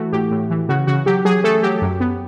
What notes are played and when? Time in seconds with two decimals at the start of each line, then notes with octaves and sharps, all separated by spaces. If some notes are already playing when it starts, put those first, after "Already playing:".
Already playing: E3 A3 E4 F#4
0.12 A2 G4
0.31 A2
0.50 E3
0.69 C#3 F#4
0.87 C#3 F#4
1.06 F#3 G4
1.25 F#3 G#4
1.44 A3 A4
1.63 F#3 G4
1.82 F#2
2.00 B3